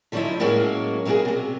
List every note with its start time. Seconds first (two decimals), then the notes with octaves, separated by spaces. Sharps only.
0.12 D3 F3 F#3 C#4 D#4 E4
0.40 A2 F#3 G#3 A#3 C#4 F#4
1.05 B2 F#3 A#3 F4 F#4 G#4
1.25 C3 F#3